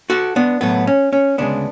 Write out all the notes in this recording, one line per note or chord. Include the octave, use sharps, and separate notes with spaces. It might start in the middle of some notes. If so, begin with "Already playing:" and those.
F#4 A4
B3 D4
A2 F#3 A3 B3
C#4
C#4
D2 C#3 G#3 B3 D4